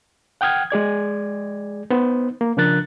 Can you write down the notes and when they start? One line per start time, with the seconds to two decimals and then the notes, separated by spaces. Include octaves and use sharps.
0.41 F#5 G5 D#6 F6 G#6
0.70 G#3 G#4 D5 G#6
1.90 B3 D#4 C5
2.41 A#3
2.57 C#3 F3 D4 A#4 F#6 A6